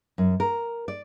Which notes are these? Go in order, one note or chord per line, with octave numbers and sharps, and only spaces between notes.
F#2
A#4
D5